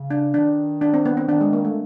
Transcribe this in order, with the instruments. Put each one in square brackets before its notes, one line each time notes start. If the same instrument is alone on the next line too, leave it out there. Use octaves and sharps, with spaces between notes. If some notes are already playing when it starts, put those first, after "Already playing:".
Already playing: [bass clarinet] C#3
[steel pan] D4
[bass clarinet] D#3 [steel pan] D4
[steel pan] D4
C4
B3
C4
[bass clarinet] D#3 [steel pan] D4
[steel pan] G#3
A#3
A3